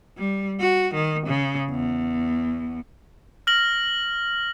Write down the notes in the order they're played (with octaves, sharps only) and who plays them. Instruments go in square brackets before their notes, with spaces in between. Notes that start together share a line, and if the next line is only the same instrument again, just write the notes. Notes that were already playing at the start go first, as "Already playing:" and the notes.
[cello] G3
F#4
D#3
C#3
E2
[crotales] F6 A#6 F#7